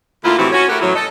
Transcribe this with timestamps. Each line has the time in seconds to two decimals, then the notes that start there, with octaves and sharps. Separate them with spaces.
0.24 D2 A#3 E4 F4
0.37 F2 A2 E3 C4 F#4 G4
0.52 C#4 F#4
0.69 A3 E4 F#4 G4 A#4
0.81 F#2 A2 E3 F#3
0.94 A4 D#5